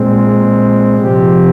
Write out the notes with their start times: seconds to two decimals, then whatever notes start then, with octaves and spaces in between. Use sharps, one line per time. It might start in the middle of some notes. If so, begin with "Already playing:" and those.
Already playing: A#2 G#3 C4
0.98 C3 F3 C4 G4